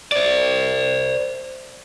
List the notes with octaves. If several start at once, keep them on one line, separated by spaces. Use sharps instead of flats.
C5 D5